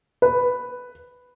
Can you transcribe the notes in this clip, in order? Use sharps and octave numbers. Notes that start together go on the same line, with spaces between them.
B4